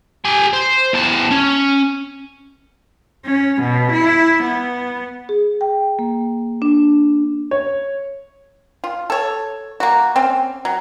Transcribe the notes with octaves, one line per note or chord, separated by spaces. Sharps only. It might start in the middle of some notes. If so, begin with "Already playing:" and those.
G4 G#5
C5
E2 A5
C#4
C#4
B2
E4
B3
G#4
G5
A#3
D4
C#5
F4
A4 C#5
A#3 F#4
C4 C#4
F#3